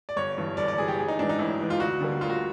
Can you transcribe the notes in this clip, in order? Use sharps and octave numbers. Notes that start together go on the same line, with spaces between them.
D5
G1 C#5
G2 E3
G1 D5
D5
G2 E3 G#4
G4
A1 G#4
D#4
G#2 E3 D4
D#4
A1 E4
G#2 E3
F4
D2 F#4
D3 G3 A#3
D2 F4
F#4